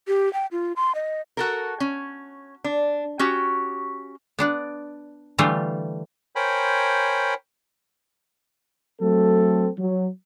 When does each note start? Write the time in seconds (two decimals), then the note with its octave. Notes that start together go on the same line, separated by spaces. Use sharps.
0.08 G4
0.33 G5
0.52 F4
0.76 C6
0.95 D#5
1.37 F#4 A4 A#4
1.80 C#4
2.64 D4
3.19 C#4 F#4 G4
4.39 B3 D4 D5
5.38 D3 E3 G3 A3 F4
6.36 A#4 C5 C#5 G5 G#5 B5
9.01 F#3 A3 C4 A4
9.78 F#3